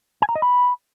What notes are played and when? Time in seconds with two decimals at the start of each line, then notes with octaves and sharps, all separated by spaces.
0.22 G#5
0.29 A#5
0.35 D#5
0.42 B5